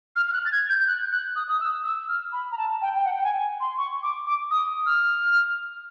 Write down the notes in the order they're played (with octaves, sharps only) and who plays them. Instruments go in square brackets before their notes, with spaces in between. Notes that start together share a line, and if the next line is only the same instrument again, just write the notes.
[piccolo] F6
F6
F#6
A6
G#6
G6
G6
F#6
F#6
D#6
D#6
E6
E6
F6
B5
A#5
A5
G5
G5
F#5
G5
G#5
C6
C#6
D6
D6
D#6
F6